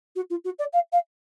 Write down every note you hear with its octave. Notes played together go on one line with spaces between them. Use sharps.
F#4
F4
F#4
D5
F5
F5